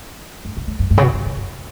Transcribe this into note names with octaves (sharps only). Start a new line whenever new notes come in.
F#2
G2
F#2
F#2
G2
C#3
B2
G2
F#2
F#2